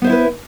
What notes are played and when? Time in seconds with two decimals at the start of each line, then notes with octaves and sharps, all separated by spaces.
0.02 B3
0.04 C5
0.07 E5
0.10 E4
0.12 B4